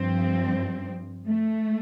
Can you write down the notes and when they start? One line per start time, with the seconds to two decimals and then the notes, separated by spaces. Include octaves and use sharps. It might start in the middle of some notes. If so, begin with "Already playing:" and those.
Already playing: G2 F3 C4
1.27 A3